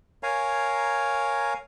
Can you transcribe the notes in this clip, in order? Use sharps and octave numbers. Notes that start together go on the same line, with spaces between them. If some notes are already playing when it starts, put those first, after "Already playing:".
A#4 C#5 F5 G#5 A#5